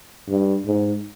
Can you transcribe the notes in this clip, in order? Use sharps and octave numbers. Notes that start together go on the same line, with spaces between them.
G2
G#2